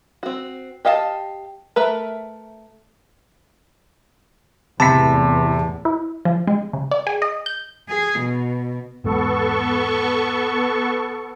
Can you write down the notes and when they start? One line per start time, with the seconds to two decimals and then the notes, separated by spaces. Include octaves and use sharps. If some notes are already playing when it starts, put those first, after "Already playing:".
0.23 C4 F#4
0.85 G4 D#5 F5 G5 A5
1.76 A3 A#4 B4 E5
4.80 E2 A2 C3 A5 B5 B6
5.85 E4
6.25 F3
6.47 G#3
6.73 C#3
6.91 D5
7.07 G#4
7.22 D#5
7.46 G6
7.88 G#4
8.19 B2
9.04 G#1 E2 G#2 B3 A4 C#6